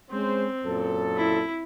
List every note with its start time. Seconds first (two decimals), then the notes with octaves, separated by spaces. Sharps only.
0.11 G#3 C4 C#4 C5
0.64 F#2 A#2 A4
1.17 E4